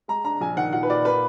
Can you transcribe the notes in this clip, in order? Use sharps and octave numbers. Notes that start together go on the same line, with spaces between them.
G#3 A#5
D4 A#5
A#1 G#5
D#3 F#5
A#2 F#5
B4
A#2 D5
A#3 B4